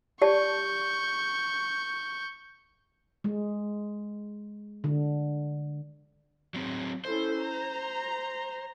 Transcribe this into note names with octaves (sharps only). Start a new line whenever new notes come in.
G4 D5 A5 C#6 G6
G#3
D3
F#3 C4 G#4
C#4 E4 A4 C5
A#5